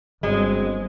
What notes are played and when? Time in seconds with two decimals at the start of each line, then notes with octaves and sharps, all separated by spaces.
0.23 G1 F#3 G#3 C4